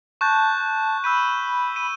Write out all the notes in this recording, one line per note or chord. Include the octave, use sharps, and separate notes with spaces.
A5 C#6 F#6 G6
B5 E6 G6 D#7
D#7